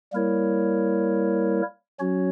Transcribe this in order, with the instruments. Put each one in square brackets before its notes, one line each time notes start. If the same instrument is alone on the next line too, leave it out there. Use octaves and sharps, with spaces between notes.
[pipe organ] G3 A#3 E4 A#4 C#5
F#3 C#4 F#4 C#5